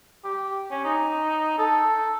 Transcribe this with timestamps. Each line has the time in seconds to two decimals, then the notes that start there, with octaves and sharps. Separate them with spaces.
0.24 G4
0.71 C#4
0.84 D#4
1.58 A4